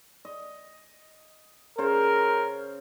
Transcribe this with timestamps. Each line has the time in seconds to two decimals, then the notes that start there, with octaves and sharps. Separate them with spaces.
0.25 D#5
1.78 C#3 A#4 C5